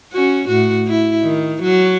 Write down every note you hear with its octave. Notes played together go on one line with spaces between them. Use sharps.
C#4 F#4
A2 F#4
E4
D#3
F#3